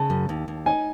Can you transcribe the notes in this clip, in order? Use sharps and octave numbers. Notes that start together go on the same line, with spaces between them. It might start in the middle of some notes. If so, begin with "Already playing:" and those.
Already playing: C#3 A5
F#2
D#2
D#2
D#4 G#5